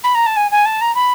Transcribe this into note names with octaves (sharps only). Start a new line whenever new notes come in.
B5
A#5
A5
G#5
G#5
A5
A#5
B5